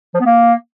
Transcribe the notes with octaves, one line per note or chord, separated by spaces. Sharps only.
F3
B3
A#3